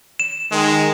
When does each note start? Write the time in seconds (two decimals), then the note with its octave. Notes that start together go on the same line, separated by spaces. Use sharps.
0.20 E7
0.52 D#3 G#3